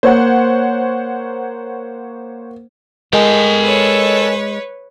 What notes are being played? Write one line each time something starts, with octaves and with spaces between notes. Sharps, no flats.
A#3 C5 C#5 F#5
G#3 A4 A#4 D#5 G5 G#5
B4 C#5